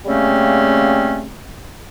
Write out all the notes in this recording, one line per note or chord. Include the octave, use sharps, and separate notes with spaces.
C#3 G3 A3 A#3 C4 C#4